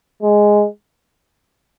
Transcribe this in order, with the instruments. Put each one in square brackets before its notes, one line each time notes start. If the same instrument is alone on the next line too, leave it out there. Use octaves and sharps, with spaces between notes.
[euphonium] G#3